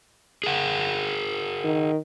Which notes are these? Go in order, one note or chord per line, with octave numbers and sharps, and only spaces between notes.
G#4 A#4 F#5
D#3